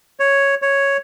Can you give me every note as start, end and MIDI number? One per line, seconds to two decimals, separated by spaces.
0.20 0.55 73
0.62 0.97 73